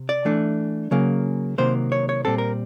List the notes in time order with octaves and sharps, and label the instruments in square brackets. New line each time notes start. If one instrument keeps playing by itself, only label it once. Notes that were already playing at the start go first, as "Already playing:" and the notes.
Already playing: [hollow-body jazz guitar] C3
D5
E3 A3 D4
C#3 F#3 A#3
C3 D#3 F#3 A#3 C5
C#5
C#5
A#2 G3 C4 A4
A#4